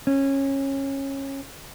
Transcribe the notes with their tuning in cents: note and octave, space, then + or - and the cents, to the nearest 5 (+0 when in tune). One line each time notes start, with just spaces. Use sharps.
C#4 -20